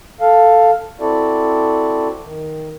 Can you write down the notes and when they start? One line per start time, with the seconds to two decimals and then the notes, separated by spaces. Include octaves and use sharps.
0.21 A4 F5
1.00 C4 E4 F#4 A4 D5
2.23 D#3